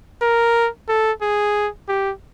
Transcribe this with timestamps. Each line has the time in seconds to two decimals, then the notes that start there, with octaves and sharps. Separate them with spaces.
0.22 A#4
0.89 A4
1.22 G#4
1.88 G4